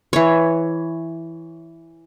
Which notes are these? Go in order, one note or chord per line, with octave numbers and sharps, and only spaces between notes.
E3 C#5